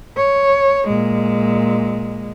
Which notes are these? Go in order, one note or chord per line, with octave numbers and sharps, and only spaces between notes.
C#5
A#2 G#3